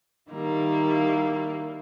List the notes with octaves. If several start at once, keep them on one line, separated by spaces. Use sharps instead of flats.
D#3 G3 A#3 E4